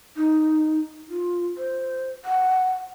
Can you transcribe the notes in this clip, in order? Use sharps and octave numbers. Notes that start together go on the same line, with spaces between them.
D#4
F4
C5
F#5